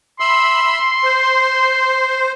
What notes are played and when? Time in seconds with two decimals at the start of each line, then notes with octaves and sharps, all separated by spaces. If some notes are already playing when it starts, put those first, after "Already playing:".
0.20 E5 B5 C6 E6
1.04 C5